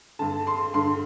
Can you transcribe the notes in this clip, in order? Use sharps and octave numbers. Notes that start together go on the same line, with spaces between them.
G2 D3 A5
C6
G2 D3 C6